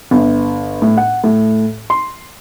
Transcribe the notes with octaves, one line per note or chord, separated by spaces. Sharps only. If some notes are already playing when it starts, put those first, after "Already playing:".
G1
A2
F#5
A2
C6